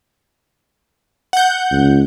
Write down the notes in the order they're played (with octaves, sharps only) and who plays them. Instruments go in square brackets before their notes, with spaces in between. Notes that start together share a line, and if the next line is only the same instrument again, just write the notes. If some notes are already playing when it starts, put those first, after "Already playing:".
[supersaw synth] F#5 G6
[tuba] C#2